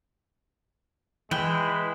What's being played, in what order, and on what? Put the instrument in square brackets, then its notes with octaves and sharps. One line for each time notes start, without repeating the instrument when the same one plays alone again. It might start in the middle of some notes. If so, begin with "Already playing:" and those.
[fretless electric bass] E3 [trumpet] G#3 [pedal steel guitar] E4 B4 [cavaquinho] G5